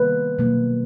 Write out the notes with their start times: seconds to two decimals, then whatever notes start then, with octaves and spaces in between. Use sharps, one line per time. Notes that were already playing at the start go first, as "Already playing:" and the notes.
Already playing: C3 D#3 G3 A#3 B4
0.39 B2 F#3 A#3